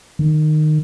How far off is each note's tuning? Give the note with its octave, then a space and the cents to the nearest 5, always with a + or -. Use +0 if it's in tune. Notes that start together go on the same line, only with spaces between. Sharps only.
D#3 -20